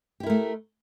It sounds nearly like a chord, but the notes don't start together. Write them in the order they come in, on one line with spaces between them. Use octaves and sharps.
G4 E4 A#4 A3